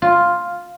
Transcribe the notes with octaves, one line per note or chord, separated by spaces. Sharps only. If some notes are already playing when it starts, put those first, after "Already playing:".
F4